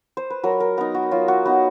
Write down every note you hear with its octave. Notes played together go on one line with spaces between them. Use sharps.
C5
B4
F#3 A#4
A#4
B3 D#4 A#4
F#4
F#3 F4
F#4
B3 D#4 F#4